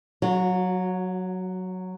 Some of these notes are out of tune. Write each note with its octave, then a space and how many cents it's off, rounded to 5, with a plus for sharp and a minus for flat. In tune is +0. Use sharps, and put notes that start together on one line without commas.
F#3 +0 F#4 -35